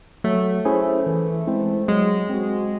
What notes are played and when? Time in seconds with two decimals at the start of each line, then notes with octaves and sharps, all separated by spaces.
0.24 F#3 A3
0.65 C#4 E4 G#4 C5
1.07 E3
1.47 G#3 C4 E4 C5
1.88 F#3 G#3
2.29 C4 F#4